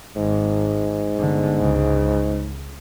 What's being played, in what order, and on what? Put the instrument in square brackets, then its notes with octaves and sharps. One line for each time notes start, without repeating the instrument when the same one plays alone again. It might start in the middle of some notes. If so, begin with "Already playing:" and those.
[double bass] G#1 [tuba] G#2
[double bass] G1 D3
C#2 C#3